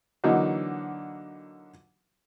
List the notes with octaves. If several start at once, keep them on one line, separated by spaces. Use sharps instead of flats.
D3 E3 F#3 A#3 D#4 F#4